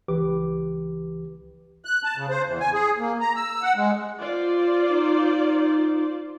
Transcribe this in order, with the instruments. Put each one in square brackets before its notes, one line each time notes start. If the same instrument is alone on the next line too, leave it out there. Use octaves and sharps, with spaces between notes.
[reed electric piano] C#2 E3 G4 B4 D6
[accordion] F#6
A5
C#3
C5
E2
G#5
G#4
A#3
A#5
E6
F#5
G#3
[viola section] F4 C5 D5
[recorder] D#4